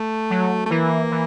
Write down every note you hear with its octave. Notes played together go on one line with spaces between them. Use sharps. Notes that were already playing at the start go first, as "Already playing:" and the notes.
Already playing: A3
F#3
A3
E3 A#3
E3